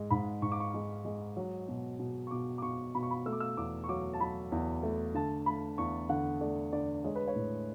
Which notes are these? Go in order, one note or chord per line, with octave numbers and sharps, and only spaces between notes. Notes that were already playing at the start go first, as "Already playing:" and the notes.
Already playing: G#2 G#3
G#2 B5
G#2 C#6
D6
C#6
G#3
G#3
F#3
B2
B2
C#6
B2 D6
D6
B2 C#6
B2 B5
C#6
B5
A3 E6
D6
E6
E2 D6
C#6
F#3 D6
A5
F#3 B5
E2
A3
D3 A5
A3 B5
E2 C#6
D3 F#5
A3 D5
D3 D5
G#3 C#5
B4
C#5
A2